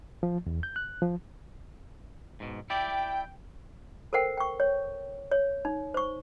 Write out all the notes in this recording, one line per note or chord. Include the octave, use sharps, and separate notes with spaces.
F3
E2
G6
F#6
F3
G#2 B2
E4 G4 D5 G5
A4 A#4 C5 F#5 G5
G5 C#6
C#5
C#5
D#4
C5 C#6